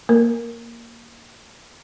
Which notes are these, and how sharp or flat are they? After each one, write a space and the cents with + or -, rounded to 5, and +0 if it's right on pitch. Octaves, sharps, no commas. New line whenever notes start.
A#3 +0 A#4 +0